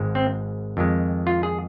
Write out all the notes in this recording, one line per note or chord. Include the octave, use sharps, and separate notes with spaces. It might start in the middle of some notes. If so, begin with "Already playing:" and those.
Already playing: G#1 G#2 G#3
C4
F2 D#3 G#3
F4
G#4